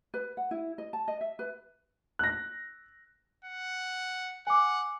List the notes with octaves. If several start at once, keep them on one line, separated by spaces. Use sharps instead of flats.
B4
F#5
E4
D#5
A5
D#5
E5
B4
F#6 A#6
F#5
F#5 G#5 D6